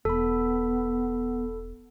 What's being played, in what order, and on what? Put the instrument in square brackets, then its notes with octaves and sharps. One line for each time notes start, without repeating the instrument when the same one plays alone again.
[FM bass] E1 [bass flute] B3 [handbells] A4 B5